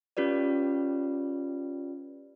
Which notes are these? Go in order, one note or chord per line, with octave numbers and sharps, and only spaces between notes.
C#4 F4 G4 B4 D5